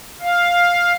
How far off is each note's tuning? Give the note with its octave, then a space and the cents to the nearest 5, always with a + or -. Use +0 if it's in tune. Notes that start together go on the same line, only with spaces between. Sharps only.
F5 +5